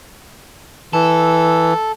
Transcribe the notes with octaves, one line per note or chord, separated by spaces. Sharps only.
E3 A4